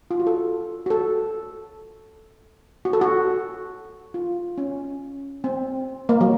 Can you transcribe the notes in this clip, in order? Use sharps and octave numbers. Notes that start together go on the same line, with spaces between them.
F4
F#4
A4
F#4
A4
F#4
A4
F#4
F4
C#4
C4
A#3
F#3